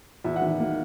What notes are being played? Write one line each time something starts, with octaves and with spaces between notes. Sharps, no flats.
E2 E5
F#5
D#3
A#3